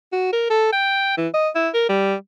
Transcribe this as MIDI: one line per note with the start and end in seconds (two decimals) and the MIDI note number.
0.12 0.32 66
0.33 0.46 70
0.50 0.70 69
0.73 1.15 79
1.17 1.28 52
1.34 1.49 75
1.55 1.69 64
1.74 1.89 70
1.89 2.15 55